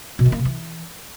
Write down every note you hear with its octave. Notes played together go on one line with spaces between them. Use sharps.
B2
D#3
A#3
C3
E3